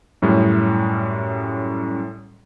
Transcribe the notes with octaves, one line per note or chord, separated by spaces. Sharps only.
F#2 A2 G3 C#4